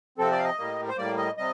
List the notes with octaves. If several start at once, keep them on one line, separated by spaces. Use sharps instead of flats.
C3 F3 C4 A4
D5
F5
D#5
A2 G3 A#3
C5
A2 G3 A#3 D5
D#5
C3 G3 D#5